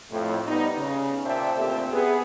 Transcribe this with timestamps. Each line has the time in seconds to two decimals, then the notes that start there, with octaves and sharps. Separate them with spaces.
0.11 F2 A2
0.47 G3 B3 D#4
0.79 C#3
1.25 A#2 C5 D5 E5 G5 A5
1.57 D2 A#2 C4 G4 A4 E5
1.92 B3 G#4